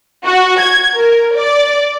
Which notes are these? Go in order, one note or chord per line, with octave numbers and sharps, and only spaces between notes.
F#4
G#6
A#4
D5